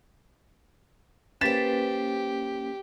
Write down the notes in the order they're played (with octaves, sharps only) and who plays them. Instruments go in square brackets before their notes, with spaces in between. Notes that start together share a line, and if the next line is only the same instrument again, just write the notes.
[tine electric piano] A#3 C#4 [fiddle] G4 [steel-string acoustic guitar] B4 C5 [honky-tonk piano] A6 B6 E7